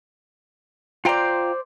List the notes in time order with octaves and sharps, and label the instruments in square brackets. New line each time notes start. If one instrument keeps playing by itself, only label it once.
[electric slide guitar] F4 G5 A#5 [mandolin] C5 D5